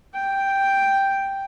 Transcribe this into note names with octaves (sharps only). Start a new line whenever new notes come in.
G5